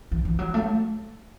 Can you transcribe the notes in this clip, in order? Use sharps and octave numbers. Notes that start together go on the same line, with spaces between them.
E3
E3
F#3
A3